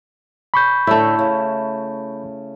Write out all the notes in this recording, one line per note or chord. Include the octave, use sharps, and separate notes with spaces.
B5 C#6 G6
A2 D3 A3 E4
C#3